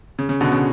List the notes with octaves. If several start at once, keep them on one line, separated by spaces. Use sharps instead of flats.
C#3
C#3
B2 D3
C#3